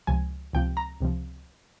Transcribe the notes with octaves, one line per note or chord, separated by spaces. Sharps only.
C#2 C3 F3 G#5
C#2 C3 F3 G5
A#5
C#2 C3 F3